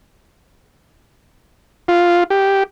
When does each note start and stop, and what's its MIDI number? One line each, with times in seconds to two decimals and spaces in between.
1.88 2.24 65
2.30 2.63 67